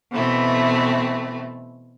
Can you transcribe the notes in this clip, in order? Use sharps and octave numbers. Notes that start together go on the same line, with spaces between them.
B2 E3 A3 C4